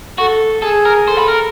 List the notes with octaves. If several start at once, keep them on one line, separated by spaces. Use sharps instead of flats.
F#4 A4
G#4 A4
A#4
A4 C5
B4
A#4